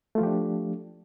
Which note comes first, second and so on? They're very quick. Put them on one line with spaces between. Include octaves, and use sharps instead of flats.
A3 F4 F3 G4 D4